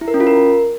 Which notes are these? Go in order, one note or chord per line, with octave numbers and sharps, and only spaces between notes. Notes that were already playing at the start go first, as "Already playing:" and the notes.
E4
A#4
C#4
F4
A#4